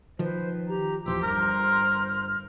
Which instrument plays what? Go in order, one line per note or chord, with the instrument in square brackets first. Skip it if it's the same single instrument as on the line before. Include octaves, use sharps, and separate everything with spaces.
[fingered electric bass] D#3 F3 [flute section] B4 C5
[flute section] G4 A#5
[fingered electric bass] D#1 E2 F3 [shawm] G4 [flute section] C5 C6 [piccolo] E6
[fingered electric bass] G1 G2 [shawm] A#4 [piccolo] F6